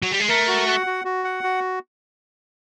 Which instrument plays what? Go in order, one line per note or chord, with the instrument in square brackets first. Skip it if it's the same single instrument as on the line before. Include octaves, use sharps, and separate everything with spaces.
[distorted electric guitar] F#3
G3
G#3
[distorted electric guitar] A3 [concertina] A#4
[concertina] F#4
F#5
F#4
F#4
F#5
F#4